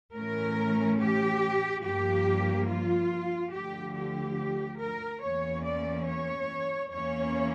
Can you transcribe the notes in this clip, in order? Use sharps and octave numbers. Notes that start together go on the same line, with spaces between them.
A2 E3 A3 C#4 A#4
G4
G2 F3 A#3 G4
F4
D2 D3 F3 G4
G4
A#4
E2 E3 A#3 C#4 C#5
D5
C#5
E2 E3 A#3 C#4 C#5